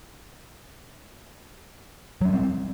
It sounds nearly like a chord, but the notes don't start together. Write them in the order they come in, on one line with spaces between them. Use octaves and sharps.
F#3 C#4 G3 C4